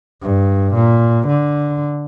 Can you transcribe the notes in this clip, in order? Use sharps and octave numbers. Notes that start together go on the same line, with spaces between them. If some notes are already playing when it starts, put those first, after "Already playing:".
G2
A#2
D3